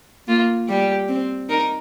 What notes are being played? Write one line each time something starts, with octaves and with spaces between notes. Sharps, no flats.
A#3 F4
G3 G4
C4
D#4 A#4